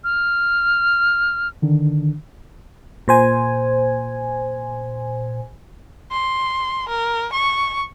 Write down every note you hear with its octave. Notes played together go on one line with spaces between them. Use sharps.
F6
D3 D#3 D4
A#2 C5 G#5
C6
A#4
C#6